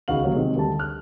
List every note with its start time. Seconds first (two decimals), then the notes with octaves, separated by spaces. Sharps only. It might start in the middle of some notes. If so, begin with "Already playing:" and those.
0.08 C#2 D#3 F#4 F5 F#7
0.24 F#3 G3 A#3 F#4 C#5
0.35 C3 D#3 G#3
0.56 D2 G3 G4 A5
0.79 F6 F#6